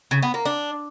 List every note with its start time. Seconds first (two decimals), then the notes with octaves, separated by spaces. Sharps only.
0.11 C#3
0.23 B3
0.34 A#3
0.45 D4